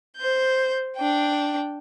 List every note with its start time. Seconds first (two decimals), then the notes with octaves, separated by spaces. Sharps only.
0.17 C5 G6
0.97 D4 G5